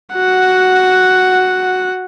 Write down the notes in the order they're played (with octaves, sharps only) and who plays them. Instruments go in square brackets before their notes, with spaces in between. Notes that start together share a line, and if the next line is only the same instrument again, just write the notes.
[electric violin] F#4 F#5